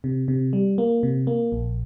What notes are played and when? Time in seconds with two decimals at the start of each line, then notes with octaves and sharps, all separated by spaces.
0.04 C3
0.28 C3
0.53 G3
0.78 A#3
1.03 C3
1.27 A#3
1.52 A#1